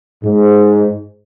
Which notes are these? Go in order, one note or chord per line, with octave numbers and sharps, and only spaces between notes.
G#2